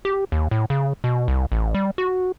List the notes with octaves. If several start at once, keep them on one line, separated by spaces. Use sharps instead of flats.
G4
D#2
A2
C#3
B2
C2
A1
G3
F#4